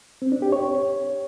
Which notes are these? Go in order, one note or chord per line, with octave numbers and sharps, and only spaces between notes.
C4
D4
G4
C#5